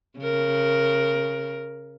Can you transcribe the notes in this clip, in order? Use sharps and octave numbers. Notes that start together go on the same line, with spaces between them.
C#3 A#4